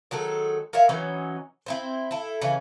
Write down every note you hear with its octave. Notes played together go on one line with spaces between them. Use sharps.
D#3 F#3 G#3 A4
A#4 C#5 E5 F5
E3 F#3 C#4 D#4
C4 E4 C5
E4 A4
C#3 E3 C#4